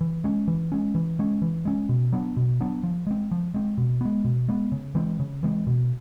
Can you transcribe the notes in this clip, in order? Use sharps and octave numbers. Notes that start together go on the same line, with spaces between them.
E3
G#3 C#4
E3
G#3 C#4
E3
G#3 C#4
E3
G#3 C#4
B2
F#3 B3 D4
B2
F#3 B3 D4
F3
G#3 C4
F3
G#3 C4
B2
G#3 B3
B2
G#3 B3
C#3
E3 G#3 C4
C#3
E3 G#3 C4
B2